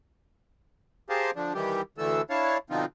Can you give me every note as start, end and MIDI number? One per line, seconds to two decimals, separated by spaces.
1.10 1.31 67
1.10 1.31 68
1.10 1.31 70
1.10 1.31 72
1.10 1.31 77
1.10 1.31 81
1.36 1.53 50
1.36 1.53 53
1.36 1.53 62
1.54 1.82 51
1.54 1.82 52
1.54 1.82 55
1.54 1.82 67
1.98 2.22 38
1.98 2.22 50
1.98 2.22 52
1.98 2.22 57
1.98 2.22 69
1.98 2.22 88
2.30 2.58 62
2.30 2.58 64
2.30 2.58 73
2.30 2.58 77
2.30 2.58 81
2.70 2.85 47
2.70 2.85 50
2.70 2.85 53
2.70 2.85 60
2.70 2.85 63
2.70 2.85 65